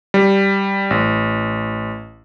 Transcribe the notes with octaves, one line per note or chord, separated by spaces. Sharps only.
G3
A1